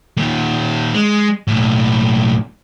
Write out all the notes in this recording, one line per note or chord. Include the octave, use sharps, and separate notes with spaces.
A#2 D#3
G#3
B1 A2